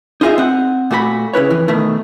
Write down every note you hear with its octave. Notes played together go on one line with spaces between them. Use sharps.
D#4 F4 G#4 D#5 E5
C4 F#5
A#2 A3 F#4 A4 B5
C#3 E4 B4 C#5
F2 E3
B2 D#3 A3